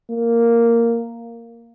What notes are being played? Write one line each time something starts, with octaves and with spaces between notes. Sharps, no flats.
A#3